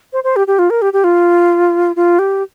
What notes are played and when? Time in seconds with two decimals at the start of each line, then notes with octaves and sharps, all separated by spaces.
0.13 C5
0.24 C5
0.36 G4
0.47 G4
0.59 F4
0.70 A#4
0.82 G4
0.93 G4
1.04 F4
1.96 F4
2.19 G4